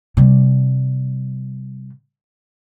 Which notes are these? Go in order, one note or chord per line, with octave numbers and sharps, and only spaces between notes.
C3 G3